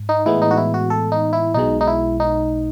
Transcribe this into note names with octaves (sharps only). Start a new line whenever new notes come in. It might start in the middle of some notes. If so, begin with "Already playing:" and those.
Already playing: G#2
D#4
A2 E3 G#3 B3 E4
D#4
F#4
E4
F#4
A4
D#4
E4
B1 B2 G#3 D#4
D#4
E4
D#4